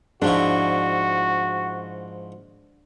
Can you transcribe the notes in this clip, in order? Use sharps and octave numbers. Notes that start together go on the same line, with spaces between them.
G#2 F3 D4 E4 F#4